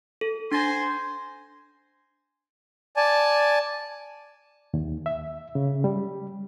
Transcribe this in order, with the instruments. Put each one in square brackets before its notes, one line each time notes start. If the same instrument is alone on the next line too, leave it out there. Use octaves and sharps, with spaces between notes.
[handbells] A4
[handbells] D4 A6 A#6 [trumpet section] C5 G#5 C6
[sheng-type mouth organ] D5 G#5 A5
[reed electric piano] D#2
E5
C#3
G3